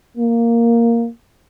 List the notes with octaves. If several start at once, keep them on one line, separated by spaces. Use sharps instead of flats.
A#3